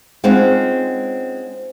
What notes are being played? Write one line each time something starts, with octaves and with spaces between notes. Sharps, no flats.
G#3 C4 C#4 D#4 F4 F#5